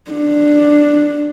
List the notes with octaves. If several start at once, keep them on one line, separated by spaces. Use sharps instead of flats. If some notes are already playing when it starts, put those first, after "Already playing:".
D4